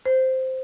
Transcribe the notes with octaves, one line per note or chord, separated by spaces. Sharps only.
C5